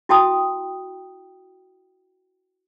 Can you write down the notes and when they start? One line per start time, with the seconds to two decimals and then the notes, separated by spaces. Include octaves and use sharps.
0.09 E4 F#4 G5 A5 D#6